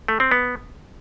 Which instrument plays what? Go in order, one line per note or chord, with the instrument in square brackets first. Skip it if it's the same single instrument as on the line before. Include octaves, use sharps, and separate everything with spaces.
[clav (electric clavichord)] A3
C4
B3